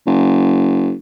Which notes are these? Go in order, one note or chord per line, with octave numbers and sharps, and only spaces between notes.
F#1